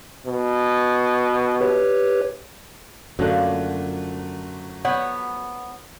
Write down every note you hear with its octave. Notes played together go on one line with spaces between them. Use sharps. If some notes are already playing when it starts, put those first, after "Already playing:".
B2
G4 B4 C#5
F#2 D3 F3 F#3 A3 A#3 F#6
B3 C#5 F#5